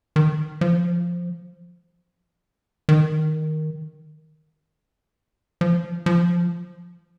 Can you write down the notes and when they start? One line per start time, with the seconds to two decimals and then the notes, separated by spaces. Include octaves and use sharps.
0.16 D#3
0.61 F3
2.89 D#3
5.61 F3
6.06 F3